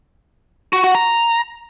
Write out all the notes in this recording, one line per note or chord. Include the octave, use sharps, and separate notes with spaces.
F#4
F#4
A#5